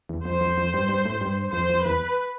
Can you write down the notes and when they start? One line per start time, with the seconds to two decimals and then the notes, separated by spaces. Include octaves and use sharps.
0.09 E2
0.25 F2 C5
0.41 F2
0.57 F2
0.74 G2
0.89 G2
1.05 A2
1.21 G2
1.53 F2 C5
1.69 F2
1.85 E2 B4